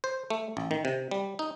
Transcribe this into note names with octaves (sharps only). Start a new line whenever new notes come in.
C5
A3
A1
D#3
C3
G3
D#4